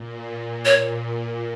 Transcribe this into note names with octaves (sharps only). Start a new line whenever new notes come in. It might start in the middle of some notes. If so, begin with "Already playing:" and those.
Already playing: A#2
C#5